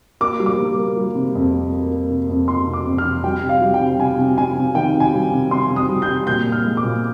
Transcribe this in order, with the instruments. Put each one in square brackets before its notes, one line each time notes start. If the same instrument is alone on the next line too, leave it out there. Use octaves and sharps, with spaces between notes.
[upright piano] A#3 D6
G3
D6
A#3
A#3
G3
C3
F2
A#3
A#3
A#3
C3
F2
F2 C6
C3
D6
F2
F6
C3
G3 G5
C3
F5
G3
G5
C3
C3 G#5
C3
C3 G#5
C3
D#3 G5
C3
G#5
G3
C3
C3 C6
C3
D#6
G3
G6
C3
A#2 G6
A#2
F6
G#3
D6
A#2